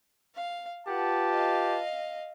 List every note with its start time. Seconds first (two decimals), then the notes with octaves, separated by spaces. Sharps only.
0.35 F5
0.87 F4 G4 B4 F#5 A5
1.30 D#5 F5